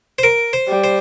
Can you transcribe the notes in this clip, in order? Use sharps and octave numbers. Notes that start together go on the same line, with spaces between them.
C5
A#4
C5
G3
C5